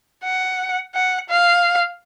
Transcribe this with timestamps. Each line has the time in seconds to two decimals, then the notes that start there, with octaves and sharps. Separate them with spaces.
0.24 F#5
0.94 F#5
1.29 F5